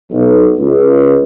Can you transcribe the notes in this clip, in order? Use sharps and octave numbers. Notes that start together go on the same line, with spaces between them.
B1
C#2